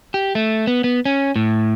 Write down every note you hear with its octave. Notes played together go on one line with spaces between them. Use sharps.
G4
A3
B3
B3
C#4
A2